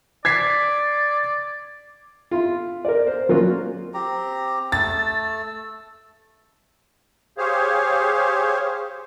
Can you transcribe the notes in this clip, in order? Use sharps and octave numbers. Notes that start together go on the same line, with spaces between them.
D5 G#6 B6 C7
E4 F4
A#4 D5
C5
F#3 A#3 C#4 F4 F#4
C4 G4 A#5
A3 E6 A6
G4 G#4 C5 C#5 F5